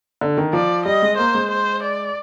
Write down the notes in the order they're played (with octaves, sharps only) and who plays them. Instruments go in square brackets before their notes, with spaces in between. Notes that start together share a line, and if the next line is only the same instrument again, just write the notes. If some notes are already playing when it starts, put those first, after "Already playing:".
[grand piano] D3
D#3
[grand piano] F3 [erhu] D5
[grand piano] G3 [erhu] D#5
[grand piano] G#3
[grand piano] A#3 [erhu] C5
[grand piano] G#3
[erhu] C5
D5